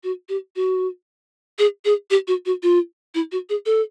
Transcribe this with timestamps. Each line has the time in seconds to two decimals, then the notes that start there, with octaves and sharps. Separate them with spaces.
0.04 F#4
0.29 G4
0.56 F#4
1.59 G#4
1.85 G#4
2.10 G4
2.28 F#4
2.46 F#4
2.63 F4
3.15 E4
3.32 F#4
3.49 G#4
3.66 A4